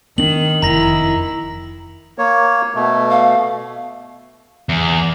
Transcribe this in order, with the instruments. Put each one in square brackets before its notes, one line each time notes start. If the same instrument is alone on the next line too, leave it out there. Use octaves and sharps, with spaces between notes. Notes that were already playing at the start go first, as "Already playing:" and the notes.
[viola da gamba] D#3 [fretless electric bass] B3 D4 [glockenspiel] F#7
[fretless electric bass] F1 [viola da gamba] D#3 E4 [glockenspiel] A#5 A#6
[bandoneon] A#3 C#5
B2 A3
[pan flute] F5
[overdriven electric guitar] E2